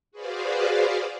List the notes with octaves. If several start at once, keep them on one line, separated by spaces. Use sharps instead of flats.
F#4 G#4 B4 C5 D5 F5